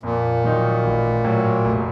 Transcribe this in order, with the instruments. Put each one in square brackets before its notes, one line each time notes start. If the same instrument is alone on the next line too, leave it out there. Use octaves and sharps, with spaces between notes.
[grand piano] F2 [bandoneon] A#2
[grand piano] D#3 F#3 A#3 D#4
A1
A2 F#3
F1